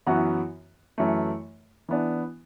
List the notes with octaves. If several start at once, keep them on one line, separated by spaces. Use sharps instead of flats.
F#2 E3 B3 F#4
F#2 E3 A3
E3 B3 D4